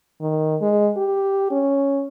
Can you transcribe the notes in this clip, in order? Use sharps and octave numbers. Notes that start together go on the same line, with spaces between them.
D#3
G#3
G4
C#4